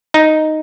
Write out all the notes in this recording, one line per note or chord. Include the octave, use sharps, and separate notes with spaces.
D#4